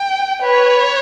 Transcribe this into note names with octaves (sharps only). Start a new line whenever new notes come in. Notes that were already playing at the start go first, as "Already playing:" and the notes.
Already playing: G5
B4 C#5